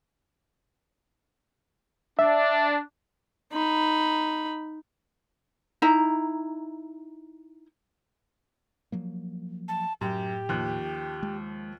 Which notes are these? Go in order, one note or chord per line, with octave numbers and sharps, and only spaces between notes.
D4 E5
D#4 B5
D#4 E4 A#5
F3 F#3 A#3
A5
F#2 A2 G4
D#2 F3 F#6
G#3